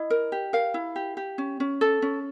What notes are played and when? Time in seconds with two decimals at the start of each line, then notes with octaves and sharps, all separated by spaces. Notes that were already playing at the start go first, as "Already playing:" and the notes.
Already playing: E4 D#5
0.10 A#4
0.32 G4
0.53 A#4 F5
0.74 E4
0.96 G4
1.17 G4
1.38 C#4
1.60 C#4
1.81 A4
2.02 C#4